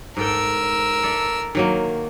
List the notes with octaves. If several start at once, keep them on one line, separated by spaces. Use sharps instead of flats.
G#2 A4 A#4 G5 E6
A4 D5 E5
D#3 F#3 A#3